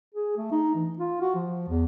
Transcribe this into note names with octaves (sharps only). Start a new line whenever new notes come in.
G#4
A3
D#4
E3
F4
F#4
F3
E2